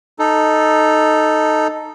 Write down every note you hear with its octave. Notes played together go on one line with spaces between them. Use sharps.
D#4 A4